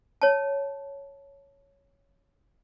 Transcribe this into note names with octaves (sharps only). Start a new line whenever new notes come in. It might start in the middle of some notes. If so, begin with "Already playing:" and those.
C#5 A5